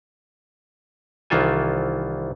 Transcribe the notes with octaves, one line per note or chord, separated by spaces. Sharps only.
C2 D#3 E3 F4 A4 G#5